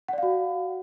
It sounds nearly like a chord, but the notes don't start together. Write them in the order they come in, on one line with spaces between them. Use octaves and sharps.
F#5 D5 F5 F#4